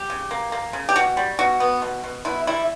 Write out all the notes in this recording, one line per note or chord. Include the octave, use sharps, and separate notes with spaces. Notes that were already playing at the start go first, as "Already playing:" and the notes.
Already playing: G4
C#3
A#3
A#3
C#3
G4
B2 F#4
G3
B2 F#4
B3
B2
B2
B2 E4
G3 E4